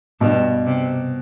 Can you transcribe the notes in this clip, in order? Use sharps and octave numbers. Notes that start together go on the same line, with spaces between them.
G2 B2
C3